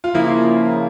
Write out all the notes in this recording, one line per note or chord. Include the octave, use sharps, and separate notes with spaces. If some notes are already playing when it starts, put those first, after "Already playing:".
F4
C#3 F3 A#3 E4